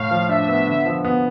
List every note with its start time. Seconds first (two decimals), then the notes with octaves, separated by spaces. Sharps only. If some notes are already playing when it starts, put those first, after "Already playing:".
Already playing: A2 F5
0.11 F3
0.29 D4 E5
0.48 B3
0.67 D3
0.85 F3
1.05 B3